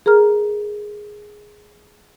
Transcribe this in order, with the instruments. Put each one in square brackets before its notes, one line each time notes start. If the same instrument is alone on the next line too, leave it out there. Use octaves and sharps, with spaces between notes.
[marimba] G#4 A#4 A#5 F6